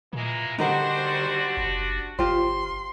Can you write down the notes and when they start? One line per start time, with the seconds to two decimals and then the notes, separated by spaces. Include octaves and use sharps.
0.13 A#2 E3 G#3 A#3
0.58 D3 G3 D4 D#4 F#4 A#4 C5 F#5
1.57 F#1
2.19 G1 F4 G4 C5 C6